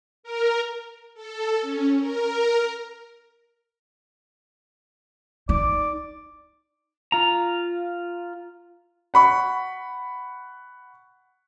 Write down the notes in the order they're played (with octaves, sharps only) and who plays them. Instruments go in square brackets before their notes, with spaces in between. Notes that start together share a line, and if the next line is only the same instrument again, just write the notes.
[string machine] A#4
A4
C#4
A#4
[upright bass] D#4 [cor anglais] D5
[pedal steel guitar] F4 A#5
[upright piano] F#5 B5 C#6